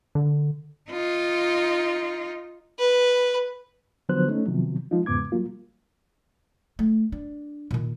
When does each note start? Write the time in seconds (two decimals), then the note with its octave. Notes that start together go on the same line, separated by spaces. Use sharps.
0.15 D3
0.91 D#4 F4
2.79 B4
4.09 D3 F3 F#3 B3 C5 F#6
4.28 A3 C#4 D#4
4.46 C3 D#3 F3 F#3 B3
4.91 F3 G#3 D#4 F4
5.06 E2 G#2 C#3 B3 D6 G#6
5.32 F#3 G3 A#3 F4
6.79 A3
7.12 D4
7.71 A#2 D#3